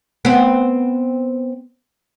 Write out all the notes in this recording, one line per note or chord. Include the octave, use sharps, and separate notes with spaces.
B3 C4